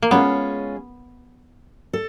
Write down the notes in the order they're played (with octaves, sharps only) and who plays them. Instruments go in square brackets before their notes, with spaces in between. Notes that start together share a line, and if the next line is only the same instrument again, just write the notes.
[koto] A#3
[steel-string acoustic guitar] G#3 C#4 F4 G#4 [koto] B3
[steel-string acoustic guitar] A4